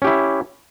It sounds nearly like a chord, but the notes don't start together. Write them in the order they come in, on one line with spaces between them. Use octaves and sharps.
C#4 G4 E4